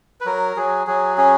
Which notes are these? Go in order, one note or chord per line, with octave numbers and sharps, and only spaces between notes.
B4
F#3 A#4
F#3 G#4
F#3 G#4
C#4 G#4